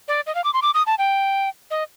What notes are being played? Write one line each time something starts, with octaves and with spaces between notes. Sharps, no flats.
D5
D#5
F5
D6
C6
D6
D#6
A5
G5
D#5